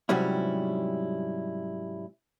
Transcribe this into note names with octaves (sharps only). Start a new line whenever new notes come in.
G#2 C3 F#3 G3 C#4 E4